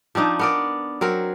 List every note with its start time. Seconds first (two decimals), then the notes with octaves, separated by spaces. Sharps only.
0.15 F3 C4 D4 D#4
0.39 B3 A#4 D5
1.01 F#3 C4 A#4